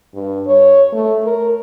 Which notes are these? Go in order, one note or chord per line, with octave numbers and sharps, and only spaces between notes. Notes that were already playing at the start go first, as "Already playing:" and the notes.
G2
C#5
A3
A#4